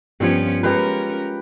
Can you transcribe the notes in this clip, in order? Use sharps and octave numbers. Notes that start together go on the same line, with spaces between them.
G2 F3 B3 C#4 F4 G#6
G#3 C#4 F4 G4 A#4 B4 G5